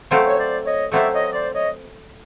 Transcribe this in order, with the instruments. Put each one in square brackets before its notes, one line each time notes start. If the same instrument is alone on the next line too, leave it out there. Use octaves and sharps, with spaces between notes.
[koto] F#3 A3 C4 F4
[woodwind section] C#5
C5 D5
C#5 D#5
[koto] F#3 A3 C4 F4 [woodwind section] D5 E5
[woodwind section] C#5 D#5
C5 D5
C#5 D#5